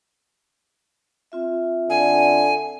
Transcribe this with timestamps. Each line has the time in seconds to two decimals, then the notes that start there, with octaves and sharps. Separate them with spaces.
1.32 C4 F4 E5
1.90 D3 G#5